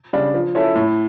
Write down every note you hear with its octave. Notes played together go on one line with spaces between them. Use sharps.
C#3 G3 D4
F3
C#4 E4 A4
A2